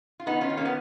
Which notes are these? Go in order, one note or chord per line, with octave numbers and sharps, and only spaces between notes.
F4
D#3 B3 D#4
C#4 F4
D#3
A#3 C#4
B3